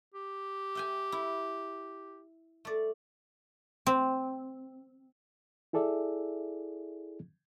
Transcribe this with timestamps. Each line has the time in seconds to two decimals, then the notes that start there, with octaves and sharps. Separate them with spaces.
0.14 G4
0.75 E5 G5 G#5
1.12 E4
2.65 A3 D5
3.86 C4
5.73 E4 G#4 A4 D5 E5